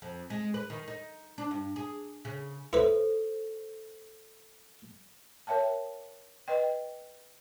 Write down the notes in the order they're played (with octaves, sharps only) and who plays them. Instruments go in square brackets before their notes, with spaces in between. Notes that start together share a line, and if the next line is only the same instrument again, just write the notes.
[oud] F2
G#3
B4
D#3
D#4
D4
G2
G#4
C#3
[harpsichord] E4 B4 [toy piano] A4 C5
[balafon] A#4 C#5 E5 G5 A5
B4 D#5 G5